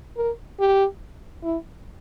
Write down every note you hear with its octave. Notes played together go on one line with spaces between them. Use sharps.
A#4
G4
E4